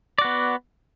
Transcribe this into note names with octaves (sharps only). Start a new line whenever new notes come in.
B3 F#4 D5